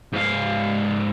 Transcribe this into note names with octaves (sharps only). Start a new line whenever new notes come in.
G#2 F5